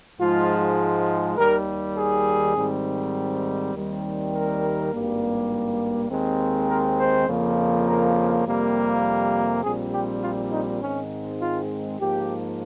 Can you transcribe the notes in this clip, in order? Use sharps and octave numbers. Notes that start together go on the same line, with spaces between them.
G#2 F3 G#3 F4
D#2 D#3 G3 A#4
G#4
G#2 D#3 G3 C4
D#2 D#3 G3 C4
A#4
G#1 G2 G3 A#3
D#2 D#3 G#3 C4
A#4
C5
F2 C#3 F3 A#3
A#4
F2 C3 G3 A#3
A#1 A#2 G3 C4 G#4
G4
F4
D#4
G#2 D#3 G#3 C4 C#4
F4
G#2 F3 A#3 G4